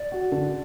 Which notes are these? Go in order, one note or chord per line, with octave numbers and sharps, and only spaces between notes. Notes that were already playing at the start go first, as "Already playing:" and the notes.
Already playing: D5
F#4
D3